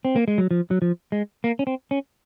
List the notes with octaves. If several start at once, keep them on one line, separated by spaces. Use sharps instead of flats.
C4
A#3
G#3
F#3
F3
F#3
F3
G#3
A#3
C#4
C4
C#4